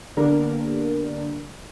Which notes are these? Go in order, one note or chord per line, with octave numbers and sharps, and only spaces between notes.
D3 G3 A#3 B3 D4 A#4